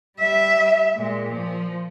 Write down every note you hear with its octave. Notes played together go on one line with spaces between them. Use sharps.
G3 E5
A#2 G#3
F3